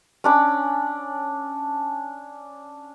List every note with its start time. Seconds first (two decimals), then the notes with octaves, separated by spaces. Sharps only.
0.24 C#4 D4 B5